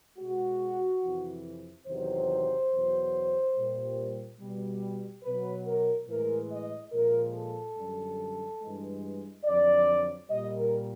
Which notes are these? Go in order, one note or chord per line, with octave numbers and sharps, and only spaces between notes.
B2 G#3 F#4
F2 C3 E3
E2 C3 D#3 F#3 C5
E2 B2 F#3
A#2 G3
B2 G3
B2 F#3 B4
A#4
A2 E3 G#3 A#4
D#5
A#2 F3 G#3 A#4
A4
F#2 D3 G3
G2 E3 G#3
F2 D3 F#3 D5
A#2 G3 D#5
A#4